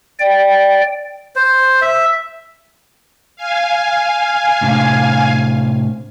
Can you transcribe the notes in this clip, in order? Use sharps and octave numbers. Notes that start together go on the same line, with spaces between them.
D5 G5
C5
E5
F5 G#5
A2 C3 D4